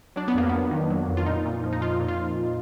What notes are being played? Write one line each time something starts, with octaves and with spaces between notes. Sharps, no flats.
F#3 D4
B3
F2 A#3
F2 B3
D#3
F#3
F2
F4
A#2 D#4
A#2
F3
D#4
F3 F4
A#2
F4